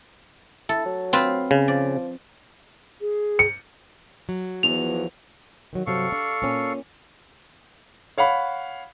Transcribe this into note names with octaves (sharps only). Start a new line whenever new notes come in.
E4 A4
F#3
C4 F4 B4
C#3
F3 D5
G#4
C#7
F#3
E2 F3 B3 F7
D#3 F#3
G2 C3 F#3 A4 F5 C#6
D4
A#2 C#4
C#5 F5 F#5 B5